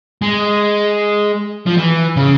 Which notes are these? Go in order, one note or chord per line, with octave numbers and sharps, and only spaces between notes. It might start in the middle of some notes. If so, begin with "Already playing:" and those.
G#3
F3
E3
C#3